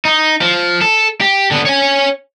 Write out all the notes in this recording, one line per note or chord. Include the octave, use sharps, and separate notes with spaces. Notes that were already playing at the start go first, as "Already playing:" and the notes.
D#4
F3
A4
G4
D3 B3
C#5 G#5